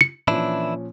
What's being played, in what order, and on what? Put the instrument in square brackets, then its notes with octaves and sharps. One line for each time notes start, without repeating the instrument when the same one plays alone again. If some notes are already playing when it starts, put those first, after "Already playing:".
[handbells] C#7
[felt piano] A#2 F3 C#4 [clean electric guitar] E3 D4 E4